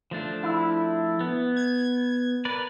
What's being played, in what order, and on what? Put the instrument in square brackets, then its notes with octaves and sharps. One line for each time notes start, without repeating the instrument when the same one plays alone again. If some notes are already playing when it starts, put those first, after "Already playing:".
[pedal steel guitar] F3 A3 D4
[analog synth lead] E4
[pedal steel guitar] B3
[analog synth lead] G#6
[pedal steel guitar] A#4 B4 D5